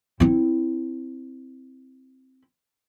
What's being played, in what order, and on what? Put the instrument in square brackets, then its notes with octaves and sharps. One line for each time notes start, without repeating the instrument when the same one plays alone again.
[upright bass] C4 E4